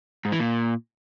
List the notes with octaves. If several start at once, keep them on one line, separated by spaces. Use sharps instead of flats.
G#2
E3
A#2